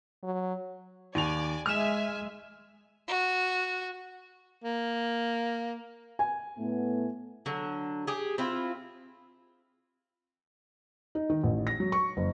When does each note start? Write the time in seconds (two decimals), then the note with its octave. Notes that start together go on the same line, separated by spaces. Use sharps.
0.23 F#3
1.15 D#2 D5 G#5 F7
1.66 G#3 E5 G#5 F6 E7
3.08 F#4
4.64 A#3
6.19 G#5
6.58 A2 A3 B3
7.46 D3 F#3
8.07 G4 G#4
8.38 C4 E4 F4
11.15 D#4
11.30 D#3
11.44 A1
11.67 A#6
11.80 F#3
11.92 C#6
12.17 F#1